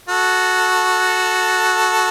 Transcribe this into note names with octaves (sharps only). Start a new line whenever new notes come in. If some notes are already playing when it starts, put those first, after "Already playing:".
F#4 A4